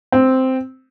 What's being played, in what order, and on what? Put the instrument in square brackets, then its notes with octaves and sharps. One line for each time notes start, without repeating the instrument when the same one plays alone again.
[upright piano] C4